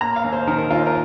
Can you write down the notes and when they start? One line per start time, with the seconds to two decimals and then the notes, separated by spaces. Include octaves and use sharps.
0.01 A#3 A#5
0.16 F5
0.24 D#2
0.32 C5
0.47 D#3 A#4
0.58 A#4
0.70 D#2 F4
0.87 A#4